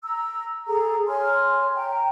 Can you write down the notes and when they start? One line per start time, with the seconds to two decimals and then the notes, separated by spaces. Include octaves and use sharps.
0.03 A#5 E6
0.68 G#4 A4 A#5
1.08 C#5 G#5 C6 F6
1.76 G5 A#5